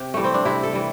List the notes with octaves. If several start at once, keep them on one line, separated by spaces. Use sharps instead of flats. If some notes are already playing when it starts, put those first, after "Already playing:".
Already playing: C3 G4
E3 G3 A3
C4
D4
C3 E4
A4
E3 G3